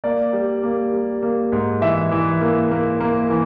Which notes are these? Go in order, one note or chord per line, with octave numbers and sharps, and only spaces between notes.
A#3 D5
G3
A#3
G3
A#3
G#2
E3 E5
E3
A#3
A#3
A#3
E3